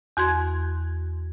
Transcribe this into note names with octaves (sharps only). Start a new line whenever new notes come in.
E2 F#4 C6 G#6